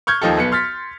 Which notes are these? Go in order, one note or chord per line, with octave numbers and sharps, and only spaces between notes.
C#6 F6 G6 G#6
D#2 F3 D#4 G4 A4
B1 B3 C#7
C6 F6 A6 B6